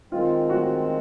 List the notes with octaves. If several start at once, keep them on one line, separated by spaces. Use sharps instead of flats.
D#3 G#3 C4 F4
F#4